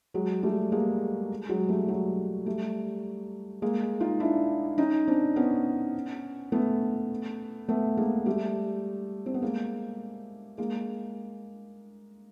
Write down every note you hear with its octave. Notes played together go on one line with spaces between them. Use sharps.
F#3 G#3
G3 A3
G#3 A#3
F#3 G#3
G3 A3
F#3 G#3
G3 A3
G#3 A#3
D#4 F4
D4 E4
C#4 D#4
C4 D4
B3 C#4
A3 B3
A3 B3
G#3 A#3
G3 A3
C4
B3
G#3 A#3
G#3 A#3